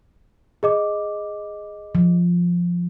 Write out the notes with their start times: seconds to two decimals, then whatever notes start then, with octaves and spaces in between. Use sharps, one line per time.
0.63 G#4 D#5 D6
1.95 F3